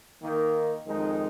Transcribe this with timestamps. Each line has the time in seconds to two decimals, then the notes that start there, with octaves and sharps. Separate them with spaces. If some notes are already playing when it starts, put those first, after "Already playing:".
0.21 D#3 A#3 D#4
0.87 F2 D#3 G#3 D#4